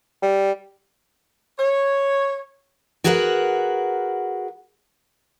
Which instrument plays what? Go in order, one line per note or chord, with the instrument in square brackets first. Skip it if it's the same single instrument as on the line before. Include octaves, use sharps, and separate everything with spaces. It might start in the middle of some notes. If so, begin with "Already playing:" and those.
[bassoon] G3
[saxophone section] C#5
[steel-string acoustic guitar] F#4 G#4 A#4 B4 D#5 F#5